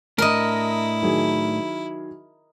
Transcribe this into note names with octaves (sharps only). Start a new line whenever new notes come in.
A2 D4 E4 A#4 D#5
D#3 F#3 G#4